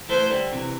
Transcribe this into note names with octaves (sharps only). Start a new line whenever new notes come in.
E3 A3 C5
D3 G3
C3 E3